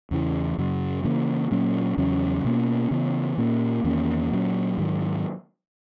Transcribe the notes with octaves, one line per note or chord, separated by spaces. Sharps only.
E2 C#3 E3
F#2 C#3 F#3
C#3 E3 A#3
A#2 F#3 A#3 C#4
E2 C#3 F#3 C#4
B2 A#3 C#4
C#3 E3 B3
A#2 A#3 C#4
E2 D#3 A#3 C#4
A#2 F#3 C#4
G#2 D#3 F#3